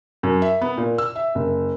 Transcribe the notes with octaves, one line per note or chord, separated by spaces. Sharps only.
F#2
E5
B3
A#2
E6
E5
F#1